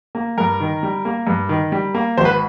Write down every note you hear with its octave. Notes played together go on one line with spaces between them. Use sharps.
A#3
G2 A#4
D#3
G3
A#3
G2
D#3
G3
A#3
G#1 C5
B4